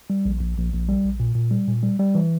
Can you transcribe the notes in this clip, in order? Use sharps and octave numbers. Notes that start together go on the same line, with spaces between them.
G3
A#1
A#1
A#1
A#1
G3
A#1
A#2
A#2
G3
A#2
G3
G3
E3